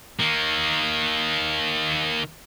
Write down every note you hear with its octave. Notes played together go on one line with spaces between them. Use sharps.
D#3 A#3